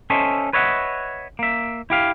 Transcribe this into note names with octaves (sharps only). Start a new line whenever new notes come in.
C#4 A4 C5 D#5 E5
B4 C#5 D#5 E5 F#5
A#3 E5
E4 G4 F5